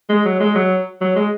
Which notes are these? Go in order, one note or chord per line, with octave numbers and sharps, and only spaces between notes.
G#3
F#3
G#3
F#3
F#3
G#3